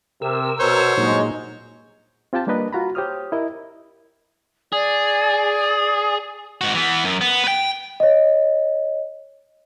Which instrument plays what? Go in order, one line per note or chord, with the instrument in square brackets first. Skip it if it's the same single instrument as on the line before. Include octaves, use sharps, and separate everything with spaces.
[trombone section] C3 [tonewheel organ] A#4 E6
[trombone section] B2 [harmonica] C5 C#5
[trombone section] G2 F#3 G#3 [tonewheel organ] A#2 D#4
[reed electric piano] C4 F4 G4 G5 A5
G3 A#3 D4 A#4 B4 D#5
F4 F#4 A#5 B5
G4 C5 C#5 D#6 F6
E4 A#4 D#5
[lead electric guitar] G#4 [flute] D5
[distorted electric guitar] G#2 F#4
E3 B3
F#2
B3
B4 G5
[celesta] C#5 D#5